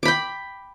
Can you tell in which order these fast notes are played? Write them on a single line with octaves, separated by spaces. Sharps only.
D6 B5 G5